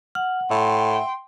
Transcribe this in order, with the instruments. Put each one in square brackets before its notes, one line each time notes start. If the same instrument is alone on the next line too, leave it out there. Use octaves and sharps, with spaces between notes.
[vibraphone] F#5 [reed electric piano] F6
[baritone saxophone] A2 [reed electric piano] E5 [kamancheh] G5 C6